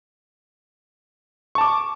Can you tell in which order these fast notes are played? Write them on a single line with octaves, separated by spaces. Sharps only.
C#6 A5 D6